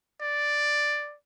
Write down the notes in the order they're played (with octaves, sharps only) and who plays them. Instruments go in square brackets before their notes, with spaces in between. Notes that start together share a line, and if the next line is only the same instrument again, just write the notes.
[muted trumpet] D5